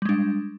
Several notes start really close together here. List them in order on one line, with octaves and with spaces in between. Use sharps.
G3 G#3 D4